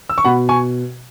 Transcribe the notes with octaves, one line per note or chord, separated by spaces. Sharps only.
E6
C#6
B2 F#5 B5
G#5 C#6